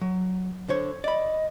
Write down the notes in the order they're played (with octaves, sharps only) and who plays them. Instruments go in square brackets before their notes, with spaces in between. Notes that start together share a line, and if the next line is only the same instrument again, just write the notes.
[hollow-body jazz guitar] F#3
D3 C5 C#5
[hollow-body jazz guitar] D5 B5 [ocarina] D#5